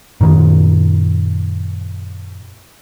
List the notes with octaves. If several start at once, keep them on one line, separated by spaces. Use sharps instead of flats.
F#2 A#2 D#3